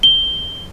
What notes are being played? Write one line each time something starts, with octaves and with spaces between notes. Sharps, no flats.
G7